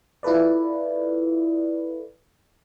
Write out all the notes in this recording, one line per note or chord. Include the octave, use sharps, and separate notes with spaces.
E4 F4 A4 B4 D5